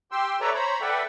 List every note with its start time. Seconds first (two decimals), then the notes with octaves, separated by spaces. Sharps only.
0.12 G4 G5 C6 E6
0.41 A4 B4 C#5 D5 E5 A#5
0.54 C5 C#5 A#5 B5
0.81 A4 B4 D5 E5 F#5 G5